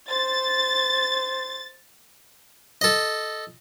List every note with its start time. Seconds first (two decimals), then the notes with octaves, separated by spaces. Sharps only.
0.10 C5 A6
2.81 A4 D#5